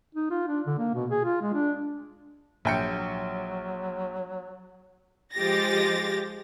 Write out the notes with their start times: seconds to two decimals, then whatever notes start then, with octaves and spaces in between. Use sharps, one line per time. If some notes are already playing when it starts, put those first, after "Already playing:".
0.15 D#4
0.31 F4
0.48 D4
0.66 D3
0.79 A#3
0.94 B2
1.10 G#4
1.25 F4
1.42 G#3
1.54 D4
2.65 A#1 F#3 G5 C#7
5.35 F3 G#3 G4 A6 A#6